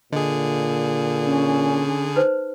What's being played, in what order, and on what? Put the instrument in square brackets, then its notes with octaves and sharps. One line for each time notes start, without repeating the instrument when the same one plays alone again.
[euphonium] A#2 [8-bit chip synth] D3 G#4 [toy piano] D#5
[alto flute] C#4
[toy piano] D#4 B4 C5